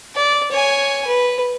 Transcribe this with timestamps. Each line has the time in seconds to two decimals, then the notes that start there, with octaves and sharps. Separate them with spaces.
0.15 D5
0.51 C#5 G#5
1.07 B4